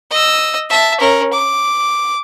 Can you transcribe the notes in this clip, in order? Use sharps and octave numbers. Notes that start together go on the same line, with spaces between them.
D#5 E6
E5 A5
C#4 A#4
D6